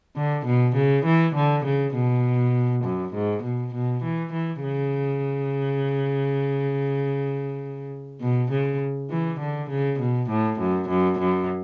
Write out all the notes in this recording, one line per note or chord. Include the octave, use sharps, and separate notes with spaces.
D3
B2
C#3
E3
D3
C#3
B2
F#2
G#2
B2
B2
E3
E3
C#3
B2
C#3
E3
D3
C#3
B2
A2
F#2
F#2
F#2